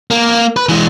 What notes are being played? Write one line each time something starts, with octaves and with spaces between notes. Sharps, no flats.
A#3
B4
E3 G#3